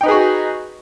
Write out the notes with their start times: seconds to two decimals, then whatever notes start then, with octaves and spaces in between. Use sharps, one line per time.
0.01 G5
0.03 D#4
0.06 B4
0.08 G#4
0.11 F#4